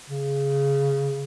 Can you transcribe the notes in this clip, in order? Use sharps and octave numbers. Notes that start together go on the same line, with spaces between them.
C#3